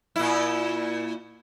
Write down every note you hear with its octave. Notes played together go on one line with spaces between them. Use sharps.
A#2 E4